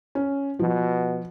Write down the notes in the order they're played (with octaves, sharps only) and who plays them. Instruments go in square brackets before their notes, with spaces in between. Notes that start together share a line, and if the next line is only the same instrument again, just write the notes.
[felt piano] C#4
[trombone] B2 [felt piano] F3